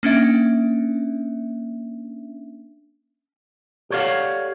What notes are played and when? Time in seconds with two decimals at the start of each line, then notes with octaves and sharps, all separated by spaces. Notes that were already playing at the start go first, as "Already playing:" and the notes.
0.03 A#3 C#4 D4 E5
3.90 G4 A4 C#5 D5 F5 F#5